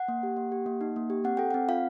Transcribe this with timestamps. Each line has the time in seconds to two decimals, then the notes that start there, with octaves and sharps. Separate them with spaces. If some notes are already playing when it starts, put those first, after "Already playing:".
Already playing: F#5
0.08 A#3
0.23 G4
0.37 A#3
0.52 G4
0.66 A#3
0.81 D#4
0.96 A#3
1.10 G4
1.24 C4 F#5
1.37 A4 G5
1.51 C4 F#5
1.68 F4 F5